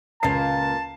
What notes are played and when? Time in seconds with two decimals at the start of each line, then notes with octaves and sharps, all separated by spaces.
0.23 C#2 A#2 A#3 A5 C7